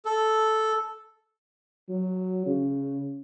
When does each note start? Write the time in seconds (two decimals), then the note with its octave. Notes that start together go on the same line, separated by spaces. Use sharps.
0.05 A4
1.89 F#3
2.46 C#3